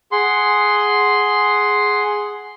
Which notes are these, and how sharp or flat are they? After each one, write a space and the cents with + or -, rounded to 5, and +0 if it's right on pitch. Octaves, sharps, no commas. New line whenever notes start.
G#4 +0 F#5 +0 C6 +0